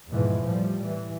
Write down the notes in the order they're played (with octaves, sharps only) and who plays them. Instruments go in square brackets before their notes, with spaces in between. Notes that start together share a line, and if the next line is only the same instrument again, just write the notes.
[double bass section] E2 G#2 B2 E3 F3
A2 F3 G3
E3